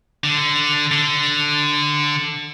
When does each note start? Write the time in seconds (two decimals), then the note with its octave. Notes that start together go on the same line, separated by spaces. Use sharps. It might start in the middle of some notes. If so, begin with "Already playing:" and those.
0.24 D3
0.92 D3